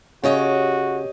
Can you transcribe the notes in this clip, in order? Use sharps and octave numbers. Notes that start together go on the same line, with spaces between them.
C#3 F#4 G4 C#5 D#5